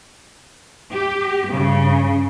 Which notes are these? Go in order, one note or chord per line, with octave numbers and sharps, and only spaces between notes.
G4
G2 C#3